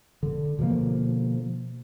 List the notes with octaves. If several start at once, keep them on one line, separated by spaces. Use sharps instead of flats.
D3
B2 D3 F3 A#3